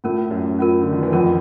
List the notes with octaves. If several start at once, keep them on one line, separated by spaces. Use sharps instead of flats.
A2 A3 C#4 F4 A#4
F#2 F#3
C#4 F4 A#4
D3
D#3
E3
F2 F3 C#4 F4 A#4